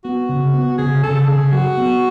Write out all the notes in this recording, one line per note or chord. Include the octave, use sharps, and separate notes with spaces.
B3 F#4
C#3
B3
C#3 G#4
C#3 A4
C#3 G#4
F#3 F#4
B3